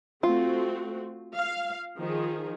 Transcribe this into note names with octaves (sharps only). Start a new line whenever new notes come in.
A3 C4 F4 F#4
F5
D#3 F3 G#4